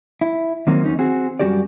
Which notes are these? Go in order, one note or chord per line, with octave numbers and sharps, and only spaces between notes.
E4
D#3 F#3 A#3 C4 C#4
E2 C#4 D#4
C4 F#4 G#4
F#2 G3 C#4 F#4 G4 D5